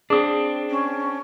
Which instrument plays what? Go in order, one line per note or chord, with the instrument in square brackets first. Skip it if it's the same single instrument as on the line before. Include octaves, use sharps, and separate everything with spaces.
[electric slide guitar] C4 D4 [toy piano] G#4 D#6
[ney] C#4